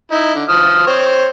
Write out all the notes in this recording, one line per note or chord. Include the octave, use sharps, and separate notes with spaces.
D#4 E4
D3
F3 D#6 F6
C4 C5 C#5